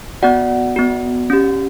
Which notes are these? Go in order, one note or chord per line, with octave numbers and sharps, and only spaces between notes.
B3 F#4 D5 F#5
B3 F#4
C#4 G4